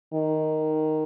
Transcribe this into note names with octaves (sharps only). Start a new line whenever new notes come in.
D#3